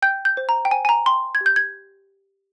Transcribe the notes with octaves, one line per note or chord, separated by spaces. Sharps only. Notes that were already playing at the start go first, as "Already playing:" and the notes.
G5 G6
G6
C5
A#5
G5
C5 G#5
G#5
A#5
G5 C6
G#6
G4
G6
G#6